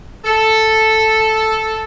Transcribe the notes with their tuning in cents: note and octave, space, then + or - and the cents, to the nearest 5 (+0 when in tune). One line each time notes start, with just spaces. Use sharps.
A4 +0